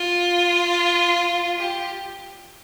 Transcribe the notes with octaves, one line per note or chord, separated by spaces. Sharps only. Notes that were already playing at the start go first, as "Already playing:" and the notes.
Already playing: F4
G4